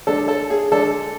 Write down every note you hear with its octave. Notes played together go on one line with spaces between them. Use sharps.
D3 G#3 D4 A4
A4
G#4
D3 G#3 D4 A4